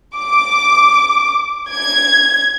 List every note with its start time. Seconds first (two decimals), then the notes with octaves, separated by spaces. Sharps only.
0.16 D6
1.71 G#6